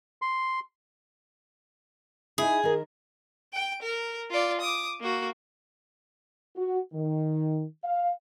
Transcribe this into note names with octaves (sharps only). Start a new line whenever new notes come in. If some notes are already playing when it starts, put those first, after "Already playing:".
C6
D#4 E4 G#4
D#3 A#4
G5 D7
A#4
F4 D5
D6 D#6
A#3 F#4
F#4
D#3
F5